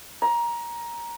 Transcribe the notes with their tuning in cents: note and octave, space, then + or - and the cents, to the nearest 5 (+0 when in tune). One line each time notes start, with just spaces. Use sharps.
A#5 +15